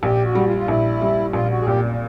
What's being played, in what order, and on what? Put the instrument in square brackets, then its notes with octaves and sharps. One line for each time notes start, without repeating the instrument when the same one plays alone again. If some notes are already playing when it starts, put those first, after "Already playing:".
[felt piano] A#1 [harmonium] G4
[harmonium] F#4
[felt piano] G3
[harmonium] F4
F4
[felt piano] A#1 [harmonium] E4
[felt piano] G3
[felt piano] A#1 [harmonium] F4
[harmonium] F#4
G#4
[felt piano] A#2 [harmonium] G4